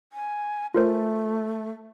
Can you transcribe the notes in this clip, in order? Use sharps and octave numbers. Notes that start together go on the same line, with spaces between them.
G#5
A3 F4 A#4 C5